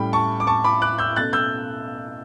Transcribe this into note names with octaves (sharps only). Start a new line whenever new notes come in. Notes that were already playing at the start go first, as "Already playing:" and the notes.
Already playing: A2 G3 C#4 G5 B5
A5 C#6
D6
A5 C#6
B5 D6
D6 F#6
E6 G6
B2 A3 C#4 F#6 A6
E6 G6